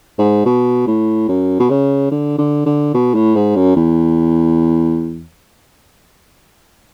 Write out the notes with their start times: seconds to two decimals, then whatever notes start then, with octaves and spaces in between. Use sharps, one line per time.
0.18 G#2
0.46 B2
0.87 A2
1.28 F#2
1.59 B2
1.70 C#3
2.11 D3
2.38 D3
2.66 D3
2.94 B2
3.14 A2
3.35 G#2
3.55 F#2
3.76 E2